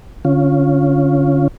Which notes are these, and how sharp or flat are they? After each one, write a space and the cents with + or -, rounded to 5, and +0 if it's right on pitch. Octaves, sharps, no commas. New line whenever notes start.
D3 -20 C#4 +0 F4 +0